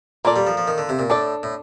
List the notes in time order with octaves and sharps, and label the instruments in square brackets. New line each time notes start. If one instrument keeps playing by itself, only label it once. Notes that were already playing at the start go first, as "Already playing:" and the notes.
[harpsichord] A#2 [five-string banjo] A#3 F4 A4 D5
[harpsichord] G3
F3
F3
D#3
D3
C3
A#2
[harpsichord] A2 [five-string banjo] D4 A4 D5
[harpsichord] A2